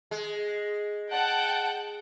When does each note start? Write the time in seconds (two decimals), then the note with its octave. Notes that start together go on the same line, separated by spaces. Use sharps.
0.11 G#3
1.10 F#5 G5 A5